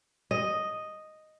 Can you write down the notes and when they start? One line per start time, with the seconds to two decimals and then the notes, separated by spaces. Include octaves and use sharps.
0.31 D#5